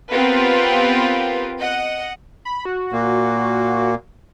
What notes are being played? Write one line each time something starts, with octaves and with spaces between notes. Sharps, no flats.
B3 C4 F4 G4 A#4 B4
D#5 F#5
B5
F#4
A#2 A#3